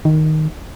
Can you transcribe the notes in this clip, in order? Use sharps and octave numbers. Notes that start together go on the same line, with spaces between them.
D#3